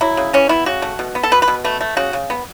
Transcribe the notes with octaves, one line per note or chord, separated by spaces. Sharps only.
F#3 E4
C#3
E3 C#4
B3 E4
C#3 F#4
A3
B2
B3
A4
B2 B4
B4
B2
A3 B4
A3
C#3 F#4
C#3
B3